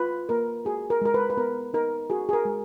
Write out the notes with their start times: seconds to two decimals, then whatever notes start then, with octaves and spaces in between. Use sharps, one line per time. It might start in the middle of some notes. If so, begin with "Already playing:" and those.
Already playing: F4 B4
0.29 A#3 A#4
0.65 F#4 G#4
0.90 A#4
1.02 G#3 A#4
1.14 B4
1.30 B4
1.37 B3 A#4
1.74 D#4 A#4
2.10 F#4 G#4
2.29 G#4
2.33 A#4
2.45 G#3